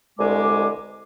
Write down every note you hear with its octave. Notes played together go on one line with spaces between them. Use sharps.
C2 B2 D3 G#3 G#5 D6